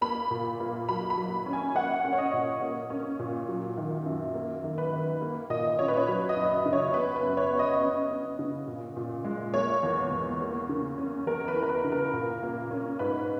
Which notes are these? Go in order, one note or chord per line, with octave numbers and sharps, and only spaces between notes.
A#3 B5
A#2
A#3
F#3 B5
B5
F#3
C#4
G#5
A#3 F#5
C#4
C#5
D#5
A#2
A#3
C#4
A#2
F#3
D#3
F#2
A#3
D#3
B4
D#3
A#3
A#2 D#5
C#4 C#5
B4
C#5
F#3 B4
D#5
F#2
C#3
C#5
B3 B4
B4
F#2
C#5
B3
D#5
C#4
C#4
C#3
A#2
A#2
G#3
A#3 C#5
E2
E2
A#3
C#3
C#4
E2 A#4
B4
E3
A#4
B4
C#3
A#4
A#2
A#3
C#4
G#2 B4